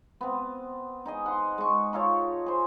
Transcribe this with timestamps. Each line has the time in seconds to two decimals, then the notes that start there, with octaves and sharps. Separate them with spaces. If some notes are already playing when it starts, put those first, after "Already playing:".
0.21 B3 C4
1.05 D#4 G#4 D#5
1.26 F#5 C6
1.58 G#3 C#6
1.93 D#4 F4 A4 C#5
2.46 G#4 C5